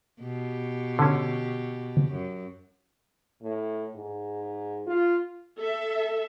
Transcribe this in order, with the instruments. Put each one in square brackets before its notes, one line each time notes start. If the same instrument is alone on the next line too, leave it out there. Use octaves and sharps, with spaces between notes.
[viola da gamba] B2 G4
[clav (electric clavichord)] D3 C#4
[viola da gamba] F#2
[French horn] A2
G#2
F4
[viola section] A4 E5